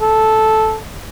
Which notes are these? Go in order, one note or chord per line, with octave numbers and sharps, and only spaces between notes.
A4